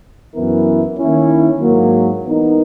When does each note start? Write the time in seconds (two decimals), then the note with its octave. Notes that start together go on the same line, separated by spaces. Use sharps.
0.35 F#2 E3 B3 E4 A#4
0.98 D#3 A#3 C#4 E4
1.61 G#2 F#3 A#3
2.24 E3 B3 D#4 A#4